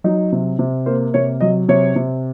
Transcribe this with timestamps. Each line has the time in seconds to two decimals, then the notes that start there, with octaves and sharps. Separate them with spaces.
0.04 F#3 D#4
0.32 C3
0.59 C3
0.86 A#3 C5
1.14 C3 C#5
1.41 F#3 D#5
1.69 C3 C#5
1.96 C3